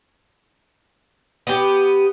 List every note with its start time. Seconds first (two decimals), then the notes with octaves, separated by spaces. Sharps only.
1.47 B3 G4